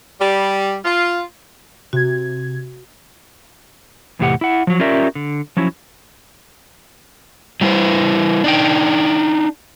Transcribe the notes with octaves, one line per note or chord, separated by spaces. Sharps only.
G3
F4
C3 F#4 G#6
E2 A2 C3 F4 G4 F#5
E4 F#5
F3 F#3
C#4 F4 G4 A#4 D5 E5
D3
F3 F#3 C#4 E4
F#3 G3 E4 B4 C5
D4 D#4 G5